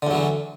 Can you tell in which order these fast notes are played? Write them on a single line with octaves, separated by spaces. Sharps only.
D3 E2 F#3 E3